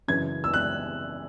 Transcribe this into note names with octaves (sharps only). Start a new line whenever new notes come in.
F#2 C#3 E3 G#6
E6
F#6